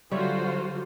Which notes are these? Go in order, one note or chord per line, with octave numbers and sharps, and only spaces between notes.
D3 F#3 G3 F4 F#4 C5 C#5 E5